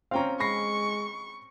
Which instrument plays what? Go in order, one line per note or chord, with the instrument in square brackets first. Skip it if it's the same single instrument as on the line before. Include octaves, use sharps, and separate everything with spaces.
[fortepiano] C4 C#4 [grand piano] F5 G5 A#5
[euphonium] G#3 [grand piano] B5 A#6 C7 [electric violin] C#6